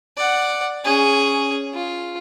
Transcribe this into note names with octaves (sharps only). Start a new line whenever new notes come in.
D5 F#5
C#4 G#4
F4